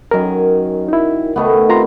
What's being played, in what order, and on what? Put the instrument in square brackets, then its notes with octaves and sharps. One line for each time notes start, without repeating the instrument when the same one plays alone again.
[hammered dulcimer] F#2 D#3 G#5 [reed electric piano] F#3 A#4
[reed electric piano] D#4 E4
[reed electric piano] C#2 [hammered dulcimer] D#3 A3 B3
[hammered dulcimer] C3 [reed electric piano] F4 A#5 C6